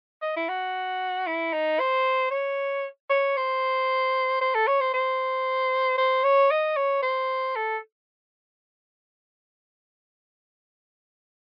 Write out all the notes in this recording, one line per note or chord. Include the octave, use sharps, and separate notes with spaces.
D#5
E4
F#4
E4
D#4
C5
C#5
C#5
C5
C5
A4
C#5
C5
C5
C5
C#5
D#5
C#5
C5
A4